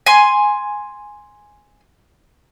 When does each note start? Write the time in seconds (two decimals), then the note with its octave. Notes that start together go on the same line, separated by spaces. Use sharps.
0.06 G#5 C6